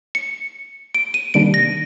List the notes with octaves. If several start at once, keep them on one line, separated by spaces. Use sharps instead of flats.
C#7
D7
D#7
C3 D#3 G3 A#3 D4 D7
A#6